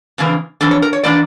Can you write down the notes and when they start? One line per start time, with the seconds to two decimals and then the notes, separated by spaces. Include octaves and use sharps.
0.18 F2 C#3 E3 A#3 D4
0.61 F2 E3 A#3 D4 A4
0.71 C#5
0.82 A#4
0.93 C#5
1.03 E3 A#3 D4 D5